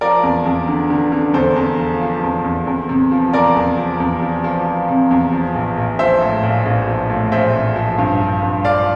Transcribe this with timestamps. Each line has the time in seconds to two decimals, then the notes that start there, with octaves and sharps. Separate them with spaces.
0.01 F3 A#4 D5
0.23 E2
0.45 E2
0.68 D3
0.90 D3
1.12 D3
1.34 E2 A4 C5
1.56 E2
1.78 F3
2.01 F3
2.23 E2
2.44 E2
2.67 E2
2.89 C3
3.11 F3
3.33 E2 A#4 D5
3.56 E2
3.78 F3
4.00 E2
4.22 F3
4.44 F3
4.66 F3
4.88 C3
5.11 E2
5.32 F3
5.54 A#1
5.77 A#1
5.99 F3 C5 E5
6.21 A2
6.43 A#1
6.66 A#1
6.87 F3
7.10 A2
7.32 A#1 C5 E5
7.54 A#1
7.76 F3
7.98 G2
8.21 F3
8.43 G2
8.64 F3 D5 F5